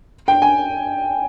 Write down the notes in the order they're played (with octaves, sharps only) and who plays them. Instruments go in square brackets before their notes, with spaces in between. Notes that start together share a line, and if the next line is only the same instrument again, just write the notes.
[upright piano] G5
G#5